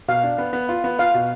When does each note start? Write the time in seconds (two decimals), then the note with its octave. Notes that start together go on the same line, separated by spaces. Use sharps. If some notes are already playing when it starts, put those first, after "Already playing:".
0.08 B2 F5
0.23 D4
0.38 B3
0.53 B3
0.69 F4
0.84 B3
0.99 F4 F5
1.14 B2